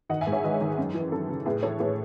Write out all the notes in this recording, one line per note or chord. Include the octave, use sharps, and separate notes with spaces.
D#3 D#5 F#5
E5 G#5
G#2
C#5 E5
D#3 B4 D#5
D#3
F#2
E3
F#2 A4
C#3
A2 G#4 B4
E3 A4 C#5
A2 G#4 B4